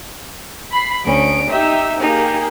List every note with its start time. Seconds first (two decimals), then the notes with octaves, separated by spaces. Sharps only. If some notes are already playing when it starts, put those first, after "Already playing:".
0.72 B5 C7
1.04 D2 C#4 D7
1.48 D#4 G4 E5 E6
2.00 A#3 D#4 G4 G#4